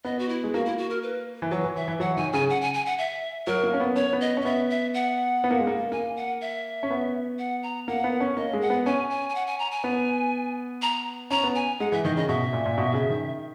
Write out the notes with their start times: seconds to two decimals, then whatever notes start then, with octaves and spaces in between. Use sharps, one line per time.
0.05 B3 D#5
0.19 F#4
0.29 E4
0.44 G#3
0.54 A#3 F#4
0.66 E4
0.78 F#4
0.90 A#4
1.03 B4
1.42 E3
1.51 F#3 B4
1.64 E3
1.75 E3 E5
1.88 E3
2.00 F#3 F#5
2.17 D#3 G#5
2.33 C#3 G#5
2.50 F#5
2.61 G#5
2.74 G#5
2.86 F#5
2.99 E5
3.47 F#3 A#4
3.63 A#3
3.74 C#4
3.80 B3
3.96 C#4 C#5
4.13 B3
4.21 D#5
4.37 C#4
4.41 D#5
4.45 B3 E5
4.70 E5
4.94 F#5
5.44 B3
5.51 A#3
5.60 G#3
5.67 A#3
5.92 A#3 G#5
6.17 F#5
6.41 E5
6.83 C#4
6.90 B3
7.39 F#5
7.63 A#5
7.88 A#3 F#5
8.04 B3
8.20 C#4
8.37 A#3 D#5
8.53 G#3
8.61 F#5
8.70 B3
8.86 C#4 G#5
9.10 G#5
9.29 G#5
9.35 F#5
9.47 G#5
9.59 A#5
9.72 G#5
9.84 B3
10.82 A#5
11.31 C#4 A#5
11.44 B3
11.55 G#5
11.80 G#3 F#5
11.92 E3 E5
12.04 D#3 D#5
12.16 C#3 D#5
12.29 B2 E5
12.53 A#2
12.66 A#2
12.78 B2
12.94 C#3
13.10 D#3